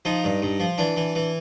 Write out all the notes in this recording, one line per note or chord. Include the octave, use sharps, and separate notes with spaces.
F3 D#4
G2
G2
F3
E3 D4
E3
E3